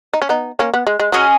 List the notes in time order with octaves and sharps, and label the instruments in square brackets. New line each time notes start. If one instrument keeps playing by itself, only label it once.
[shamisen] D#4
C#4
B3 D#4
A#3 C#4
B3
G#3
G#3
[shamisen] F#3 [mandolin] C#4 G#4 D#5